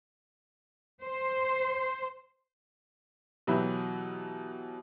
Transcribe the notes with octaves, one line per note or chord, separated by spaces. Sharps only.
C5
B2 E3 F#3 E4 G4 B4